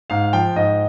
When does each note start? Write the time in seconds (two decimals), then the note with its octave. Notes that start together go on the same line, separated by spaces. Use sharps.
0.10 G#2 F5
0.33 F3 G5
0.56 G#2 D#5